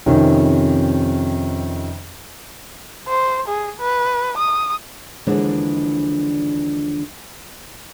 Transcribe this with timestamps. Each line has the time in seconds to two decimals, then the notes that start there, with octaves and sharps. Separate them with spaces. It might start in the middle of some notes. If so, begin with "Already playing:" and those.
0.06 F2 C3 D#3 C#4
3.08 C5
3.48 G#4
3.80 B4
4.38 D#6
5.27 D#2 D3 E3 F3 G#3 D4